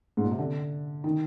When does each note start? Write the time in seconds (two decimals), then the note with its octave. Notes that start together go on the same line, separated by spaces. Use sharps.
0.17 G#2
0.24 A#2
0.31 C3
0.39 D3
1.04 D#3